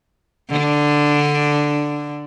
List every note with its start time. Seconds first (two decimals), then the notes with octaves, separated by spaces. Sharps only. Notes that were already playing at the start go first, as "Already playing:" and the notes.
0.49 D3 D4